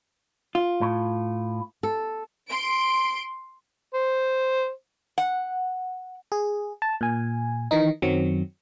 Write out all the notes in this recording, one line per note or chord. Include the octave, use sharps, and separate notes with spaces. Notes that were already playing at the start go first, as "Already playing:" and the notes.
F4
A2
A4
C6 D7
C5
F#5
G#4
A5
A#2 G#5
D#3 E3 D#4
F#2 D#3 F#3 C4